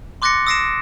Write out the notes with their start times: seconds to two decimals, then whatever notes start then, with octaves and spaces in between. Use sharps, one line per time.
0.22 C6 D6 F#6 A6 A#6 C#7
0.47 D#6 E6 A#6 C7 D7 E7